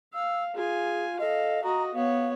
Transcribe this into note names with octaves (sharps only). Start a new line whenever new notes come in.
F5 E6
F4 G#4 G#5
A4 D#5 F5
F#4 D#5 A#5
B3 C#5 F5